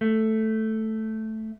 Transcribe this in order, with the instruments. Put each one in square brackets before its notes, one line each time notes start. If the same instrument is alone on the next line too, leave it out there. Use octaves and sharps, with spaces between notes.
[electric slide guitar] A3